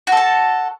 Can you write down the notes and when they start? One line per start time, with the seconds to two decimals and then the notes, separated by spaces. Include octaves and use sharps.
0.07 F#4
0.12 A4
0.17 A5